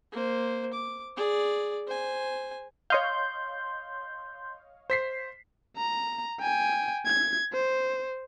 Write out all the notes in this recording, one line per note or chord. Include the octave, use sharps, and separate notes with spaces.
A#3 C5
D6
G#4 D5
C5 G#5
C#5 D#5 F5 C6 G6
C5 B6 C7
A#5
G5 G#5
G#6
C5